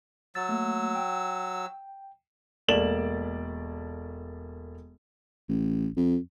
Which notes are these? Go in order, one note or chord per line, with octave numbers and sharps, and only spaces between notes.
F#3 E6 A6
A3 A#3
G5
E1 A3 A#3 D5 E7 F#7
A1
F2